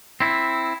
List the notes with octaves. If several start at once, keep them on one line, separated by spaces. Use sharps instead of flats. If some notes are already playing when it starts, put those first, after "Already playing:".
C4 E4